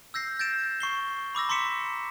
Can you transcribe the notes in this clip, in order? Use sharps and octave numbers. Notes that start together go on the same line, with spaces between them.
E6 G6 A#6 C7
G6 A6 A#6 D7 E7
C#6 C7 G7
B5 D6 E6 A#6
A#5 C6 D6 B6 C#7 E7